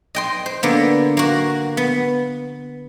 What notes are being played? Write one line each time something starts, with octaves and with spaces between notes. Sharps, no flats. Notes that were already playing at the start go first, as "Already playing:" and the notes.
D#5 G5 C6
C5
D3 A#3 B3
A#3 F#4
B3